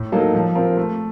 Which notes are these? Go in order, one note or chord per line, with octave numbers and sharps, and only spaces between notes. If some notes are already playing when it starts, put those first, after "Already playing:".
Already playing: A2
F#3 A#3 D#4 A4
F3
C4 F4 A#4
A3